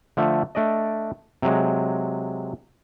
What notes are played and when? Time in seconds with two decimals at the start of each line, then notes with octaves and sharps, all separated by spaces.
0.17 D3 F3 A3
0.55 A3 D4 D5 D#5
1.42 C3 F#3 G#3